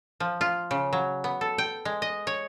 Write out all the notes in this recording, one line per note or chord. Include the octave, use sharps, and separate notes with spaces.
F3
F4
C#3
F#3
B3
A4
G5
G#3
D#5
C#5